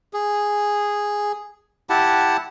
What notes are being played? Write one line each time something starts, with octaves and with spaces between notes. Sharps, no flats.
G#4
E4 G4 F#5 A5